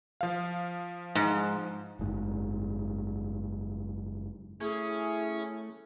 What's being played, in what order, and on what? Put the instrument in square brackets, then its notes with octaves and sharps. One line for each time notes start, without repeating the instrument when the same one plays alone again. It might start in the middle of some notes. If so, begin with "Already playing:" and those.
[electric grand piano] F3 F5
[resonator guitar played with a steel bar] G#2
[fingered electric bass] F#1 G#2
[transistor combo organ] A3 [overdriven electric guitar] C#4 [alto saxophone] E4 [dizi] G#4